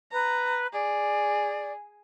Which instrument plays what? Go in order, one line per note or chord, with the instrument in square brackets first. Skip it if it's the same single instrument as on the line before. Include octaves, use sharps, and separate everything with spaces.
[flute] B4 [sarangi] A#5
[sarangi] G#4 [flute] D5